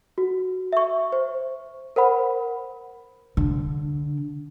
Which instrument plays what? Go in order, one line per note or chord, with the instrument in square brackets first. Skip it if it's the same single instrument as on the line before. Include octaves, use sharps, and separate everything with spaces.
[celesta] F#4
E5 C#6
C5
A#4 C5 F#5 B5
[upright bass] D3